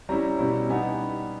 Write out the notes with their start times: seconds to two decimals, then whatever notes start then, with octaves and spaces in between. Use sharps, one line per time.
0.09 G3 C#4 E4 A#5
0.39 B2 G3 C#4 E4
0.69 G3 B3 D#4 G#5